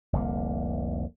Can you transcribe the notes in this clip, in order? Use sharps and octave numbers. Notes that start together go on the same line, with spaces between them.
F1 C2 D3 A#3